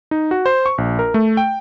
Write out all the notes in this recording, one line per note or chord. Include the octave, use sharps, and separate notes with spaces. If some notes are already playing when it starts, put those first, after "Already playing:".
D#4
F#4
C5
C#6
A#1
A#4
A3
G5